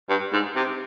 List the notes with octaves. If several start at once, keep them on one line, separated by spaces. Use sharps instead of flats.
G2
G#2
C3